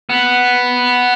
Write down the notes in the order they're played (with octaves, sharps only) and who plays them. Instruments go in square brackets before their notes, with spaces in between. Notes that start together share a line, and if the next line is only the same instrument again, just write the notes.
[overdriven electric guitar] B3